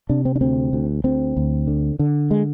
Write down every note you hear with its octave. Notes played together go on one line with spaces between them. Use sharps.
C3 D4
C4
D4
D2 C4
D2
D2 C4
D2
D3
D3
G#3